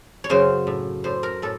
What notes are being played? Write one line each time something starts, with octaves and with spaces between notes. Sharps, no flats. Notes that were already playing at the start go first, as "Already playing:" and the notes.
C#5
F#2 C#3 C5
A2
A2 C5
A#4
A2 A4